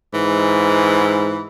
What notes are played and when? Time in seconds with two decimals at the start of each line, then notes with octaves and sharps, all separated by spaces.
0.14 G#2 E3